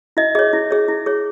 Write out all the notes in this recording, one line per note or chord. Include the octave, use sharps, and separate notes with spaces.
E4 D#5
G#4 C#5 D#5
E4
G#4 C#5
E4
G#4 C#5